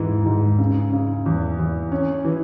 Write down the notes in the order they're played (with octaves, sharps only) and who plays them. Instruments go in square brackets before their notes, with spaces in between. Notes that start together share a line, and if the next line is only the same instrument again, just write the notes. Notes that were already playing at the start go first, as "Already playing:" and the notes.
Already playing: [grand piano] G#2 E3
G#2
C#3
C#3
E2
E2
C#4
E3